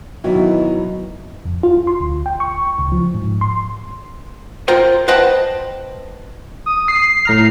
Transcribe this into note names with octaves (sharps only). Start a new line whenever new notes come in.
B2 D#3 E3 F#3 E4
F2
F4
C6
D2
G5
C#6
C#2
F3
G#2
C6
F4 A#4 C5 G5
B4 C5 D#5 F#5 G5 A5
D#6
C7
A2 A#5 F6